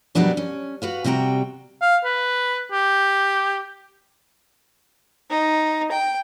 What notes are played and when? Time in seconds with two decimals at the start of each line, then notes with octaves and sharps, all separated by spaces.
0.15 B2 F#3 G3 B3 D4 A#4
0.37 C#4
0.82 F#4 B4 F5
1.04 C3 G3 F#4 G5 A#5
1.82 F5
2.05 B4
2.72 G4
5.30 D#4
5.92 G5